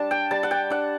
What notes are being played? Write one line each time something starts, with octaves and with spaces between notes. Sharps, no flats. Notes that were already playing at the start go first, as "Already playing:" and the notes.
Already playing: G3 D4 A5
G5
G3 A5
F#5
G5
D4 F#5